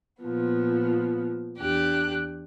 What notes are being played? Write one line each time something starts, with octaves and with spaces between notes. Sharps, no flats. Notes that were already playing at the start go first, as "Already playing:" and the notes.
A#2 F3 B3
E2 D4 G4 F#6